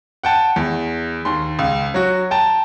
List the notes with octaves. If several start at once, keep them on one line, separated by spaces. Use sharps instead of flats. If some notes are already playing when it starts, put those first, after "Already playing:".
F#5 G5 A5
E2
D#2 C6
C#2
F#3 F#4
G5 A5 A#5